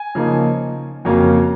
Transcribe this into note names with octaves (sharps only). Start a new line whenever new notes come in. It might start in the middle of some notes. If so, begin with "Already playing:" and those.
Already playing: G#5
C#3 F3 A#3 D#4
F2 C#3 F#3 A#3 C#4